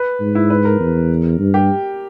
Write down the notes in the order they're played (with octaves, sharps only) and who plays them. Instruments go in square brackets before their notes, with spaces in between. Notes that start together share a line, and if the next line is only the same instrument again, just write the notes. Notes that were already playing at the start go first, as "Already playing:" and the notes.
Already playing: [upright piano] B4
[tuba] G#2
[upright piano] E4
B4
A#4
[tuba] E2
G2
[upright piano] G4